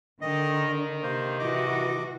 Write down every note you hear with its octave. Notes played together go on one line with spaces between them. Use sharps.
D3 D#3 D#5
C3 A#3 C5
E3 F#4 D#5 D6